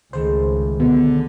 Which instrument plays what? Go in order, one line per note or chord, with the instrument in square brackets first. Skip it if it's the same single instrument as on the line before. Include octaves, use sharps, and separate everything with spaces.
[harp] G#1 D#3 A3 [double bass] C#2 [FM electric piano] C5
[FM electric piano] B2 [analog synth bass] D3